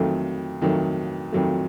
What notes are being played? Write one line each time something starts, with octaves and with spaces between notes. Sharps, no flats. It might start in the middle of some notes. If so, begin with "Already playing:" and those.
Already playing: F2 D#3 F#3 A3
F2 D#3 F#3 A3
F2 D#3 F#3 A3